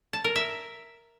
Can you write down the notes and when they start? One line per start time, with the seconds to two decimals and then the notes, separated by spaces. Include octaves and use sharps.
0.13 A5
0.24 A#4
0.36 E5